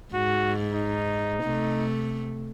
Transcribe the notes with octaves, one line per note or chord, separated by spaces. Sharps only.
G#2 F#4
D#4
C3 A3